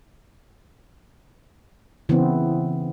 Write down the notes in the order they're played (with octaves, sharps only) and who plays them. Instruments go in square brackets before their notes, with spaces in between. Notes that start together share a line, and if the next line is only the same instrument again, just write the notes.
[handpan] C#3 E3 B3 C4